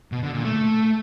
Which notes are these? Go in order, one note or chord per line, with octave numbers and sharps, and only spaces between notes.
B2
D3
A#2
A3